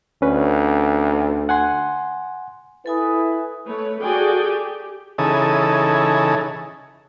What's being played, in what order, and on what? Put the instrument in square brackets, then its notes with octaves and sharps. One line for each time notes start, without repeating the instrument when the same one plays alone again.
[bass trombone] D2 [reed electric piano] C#4 B4
[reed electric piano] F#5 G#5 C6
[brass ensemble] E4 B4 [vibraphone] A4 G#5 D#6
[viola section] A3 B4 C#5
F#4 G#4 A4 D5 G5 G#5
G4
[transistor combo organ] C#3 E3 D#4 G#4 A4